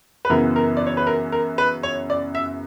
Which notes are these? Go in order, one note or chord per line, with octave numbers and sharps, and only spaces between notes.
B4
F#2 C#3 E3 B3 A#4
A#4
D5
C#5
B4
A#4
A#4
B4
C#5
D5
E5